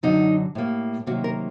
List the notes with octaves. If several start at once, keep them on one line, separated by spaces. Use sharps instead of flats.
F#2 D3 F#3 D#4
A2 G3 A#3
C3 D#3 F#3 A#3 F#4
A#4